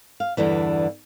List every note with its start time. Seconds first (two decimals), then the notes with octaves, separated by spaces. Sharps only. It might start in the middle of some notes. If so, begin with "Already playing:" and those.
0.20 F5
0.37 E2 G2 D3 E3